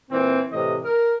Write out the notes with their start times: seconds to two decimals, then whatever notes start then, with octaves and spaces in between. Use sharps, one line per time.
0.11 A#2 E3 C4
0.52 A2 C3 E3 D#5
0.84 A#4